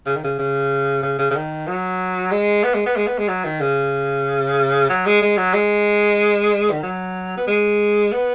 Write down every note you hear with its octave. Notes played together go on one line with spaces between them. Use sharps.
C#3
D#3
C#3
C#3
C#3
C#3
C#3
D#3
F#3
G#3
B3
G#3
B3
G#3
B3
G#3
F#3
D#3
C#3
F#3
G#3
G#3
F#3
G#3
D#3
F#3
B3
G#3
B3